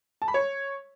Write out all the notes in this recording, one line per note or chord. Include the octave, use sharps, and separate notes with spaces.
A5
B5
C#5